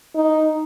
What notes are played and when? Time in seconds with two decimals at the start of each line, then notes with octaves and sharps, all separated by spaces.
0.15 D#4